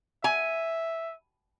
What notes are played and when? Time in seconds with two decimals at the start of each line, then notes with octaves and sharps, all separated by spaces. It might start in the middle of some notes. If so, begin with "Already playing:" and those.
0.24 E5 G#5